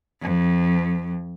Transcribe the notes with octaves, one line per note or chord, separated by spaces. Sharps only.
F2